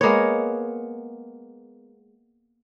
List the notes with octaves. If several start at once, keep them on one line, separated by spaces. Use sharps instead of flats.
G#3 A#3 B3 C#5